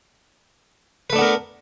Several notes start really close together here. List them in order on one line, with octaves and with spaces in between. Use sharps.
B4 A3 D4 B3 A#4